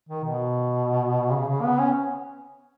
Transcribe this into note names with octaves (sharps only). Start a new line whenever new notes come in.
D#3
B2
C#3
C#3
B3
C#4